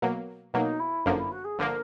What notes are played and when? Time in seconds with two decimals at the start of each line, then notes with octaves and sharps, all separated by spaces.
0.02 B2 F#3 A#3
0.54 B2 F#3 A#3 D#4
0.79 E4
1.06 G1 F#2 D3 F3 A#3 D#4
1.19 E4
1.31 F#4
1.44 G#4
1.58 G1 D3 F3 A#3 A#4